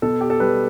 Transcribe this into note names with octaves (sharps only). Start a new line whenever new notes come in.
B2 A4
G4
A4
G3 B4